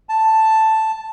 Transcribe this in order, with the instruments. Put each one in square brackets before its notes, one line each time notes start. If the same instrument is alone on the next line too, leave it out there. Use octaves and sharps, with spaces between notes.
[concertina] A5